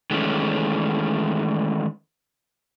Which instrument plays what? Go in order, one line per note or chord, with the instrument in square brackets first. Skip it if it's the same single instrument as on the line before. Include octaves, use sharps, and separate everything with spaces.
[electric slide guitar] D#3 E3 G#3 A3 C#4